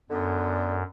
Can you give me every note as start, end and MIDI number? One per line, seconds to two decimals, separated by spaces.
0.11 0.83 42
0.11 0.81 50
0.11 0.81 59